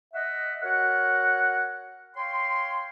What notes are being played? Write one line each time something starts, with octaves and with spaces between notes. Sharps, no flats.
D#5 E5 F#5
F#4 A#4 C#5 F#5
C#5 F5 G5 C6